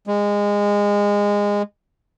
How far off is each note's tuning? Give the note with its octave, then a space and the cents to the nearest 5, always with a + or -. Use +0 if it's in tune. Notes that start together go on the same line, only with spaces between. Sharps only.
G#3 -20